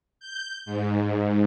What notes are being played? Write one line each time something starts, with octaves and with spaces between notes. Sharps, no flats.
G6
G#2